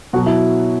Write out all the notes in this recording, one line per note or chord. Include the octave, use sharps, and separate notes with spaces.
B2 F#3 F#4
E4